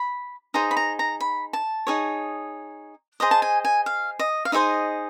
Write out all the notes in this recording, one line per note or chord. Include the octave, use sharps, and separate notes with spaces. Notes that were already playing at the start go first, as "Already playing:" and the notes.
Already playing: B5
D#4 G#4 C5 A#5
B5
A#5
A#5
B5
A5
D#4 G#4 C#5
G#4 C5 D#5 A#5
A5
G#5
G#5
F5
D#5
F5
D#4 G#4 C5 D#5 E5